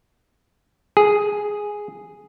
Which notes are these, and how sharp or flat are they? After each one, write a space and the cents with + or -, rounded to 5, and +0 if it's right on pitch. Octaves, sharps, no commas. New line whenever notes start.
G#4 +0